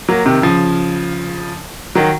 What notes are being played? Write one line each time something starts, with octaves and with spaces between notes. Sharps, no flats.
F#3 A#3
C3 D#3
C#3 F3
D#3 F#3